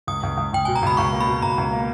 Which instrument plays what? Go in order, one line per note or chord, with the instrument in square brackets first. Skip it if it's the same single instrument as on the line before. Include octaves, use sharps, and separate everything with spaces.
[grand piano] C#2 [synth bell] D#6
[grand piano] C#2
C#2
[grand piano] C#2 [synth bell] G5
[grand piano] B2 [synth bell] G#5
[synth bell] A#5
[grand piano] C#2 [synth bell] B5
[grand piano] C#2 [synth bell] C#6
[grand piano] A#3
[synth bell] B5
[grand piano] B2
[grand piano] C#2 [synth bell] A#5
[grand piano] C#2
A#3